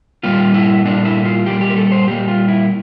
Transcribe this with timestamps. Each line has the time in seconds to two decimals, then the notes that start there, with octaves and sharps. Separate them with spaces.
0.23 A#2 G3 A#3 F4
0.54 E4
0.85 A#2 G3 A#3 D4
1.05 E4
1.25 F4
1.46 A#2 G3 A#3 G4
1.61 G4
1.70 A#4
1.77 A4
1.92 C5
2.07 A#2 G3 A#3 G4
2.28 F4
2.48 E4